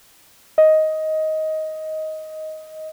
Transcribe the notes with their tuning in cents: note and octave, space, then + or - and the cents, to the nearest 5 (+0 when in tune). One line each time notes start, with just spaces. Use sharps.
D#5 +10